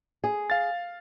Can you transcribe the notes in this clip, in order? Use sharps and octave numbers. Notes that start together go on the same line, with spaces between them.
G#4
F5 A6